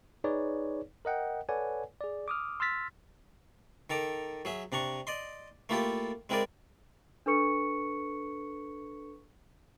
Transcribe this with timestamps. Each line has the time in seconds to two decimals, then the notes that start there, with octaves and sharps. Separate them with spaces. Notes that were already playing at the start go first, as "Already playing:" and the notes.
0.24 D#4 G#4 B4 C#5 D5
1.05 A#4 D#5 F#5 G5
1.49 A4 B4 C#5 D5 F#5 G#5
2.01 G#4 D5
2.28 D6 D#6 F6
2.60 C6 E6 F6 A6 B6
3.90 D#3 A4 A#5 D6
4.45 F#3 G#4 E5
4.72 C3 D4 A#5 C#6
5.07 D5 D#5 C6
5.69 A3 A#3 E4 F4 G4 A4
6.29 G#3 C4 E4 G#4 A#4 D5
7.26 D4 A4 B4 C#6 C#7